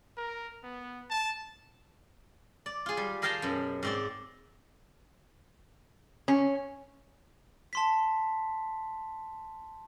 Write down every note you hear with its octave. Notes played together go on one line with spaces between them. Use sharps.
A#4
B3
A5
D5
F4 G#4
G3
G#4 A#4 F5 G5 A5 A#5
F#2 B2
G#2 C4 D5
C#4
A5 C6 B6